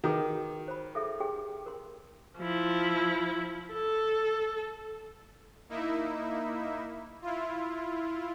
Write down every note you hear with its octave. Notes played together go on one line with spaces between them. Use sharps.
D#3 F#4 G#4 B4
C5 B5
G#4 A4 E5
G4 G#4 G5
A#4 C6
F3 E4
A4
A#3 D#4 E4 E5
E4 F4